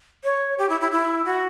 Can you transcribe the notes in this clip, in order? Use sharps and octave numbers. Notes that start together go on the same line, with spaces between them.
C#5
G4
E4
E4
E4
F#4